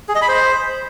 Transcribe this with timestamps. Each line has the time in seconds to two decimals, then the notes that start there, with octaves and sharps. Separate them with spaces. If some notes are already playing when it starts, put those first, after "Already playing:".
0.09 G#4
0.15 D#5
0.22 B5
0.28 C5